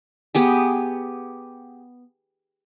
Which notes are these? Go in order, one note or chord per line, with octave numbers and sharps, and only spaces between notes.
B3 G4 G#4